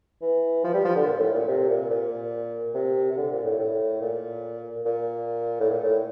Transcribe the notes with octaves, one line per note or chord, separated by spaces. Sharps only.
E3
F3
G3
F3
D3
A#2
A2
A#2
C3
A#2
A#2
C3
C3
D3
A#2
A2
A2
A#2
A#2
A2
A#2
A2